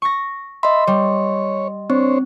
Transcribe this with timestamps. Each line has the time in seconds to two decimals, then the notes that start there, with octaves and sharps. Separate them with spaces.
0.02 C#6 A#6
0.63 D#5 E5 B5 C6
0.87 G3 C#5
1.90 C4 D4 C5 C#5